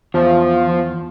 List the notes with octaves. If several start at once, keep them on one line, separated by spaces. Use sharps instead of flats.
E2 F3